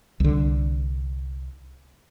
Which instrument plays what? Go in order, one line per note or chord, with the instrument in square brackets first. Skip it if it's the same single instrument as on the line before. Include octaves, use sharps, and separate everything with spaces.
[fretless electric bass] C2 D3